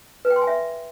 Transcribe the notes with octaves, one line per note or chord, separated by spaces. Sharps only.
B4
G5
C6
G#5
E5